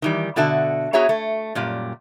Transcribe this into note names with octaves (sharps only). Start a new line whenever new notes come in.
D#3 E3 G3
B2 D3 F#4 E5 A5
B3 F#4 G#4 C#5 E5 A#5
A3
F#2 A#2 G3